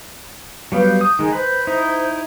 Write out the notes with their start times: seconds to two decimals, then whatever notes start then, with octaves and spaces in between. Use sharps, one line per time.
0.72 F#3 G3 B3 B4 F5 G6
1.01 D#6 G6
1.19 D#3 G#3 D#4 G#4
1.33 B4 C5 G6
1.67 D#4 E4